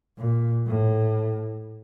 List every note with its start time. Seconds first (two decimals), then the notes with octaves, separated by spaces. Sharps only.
0.18 A#2
0.67 A2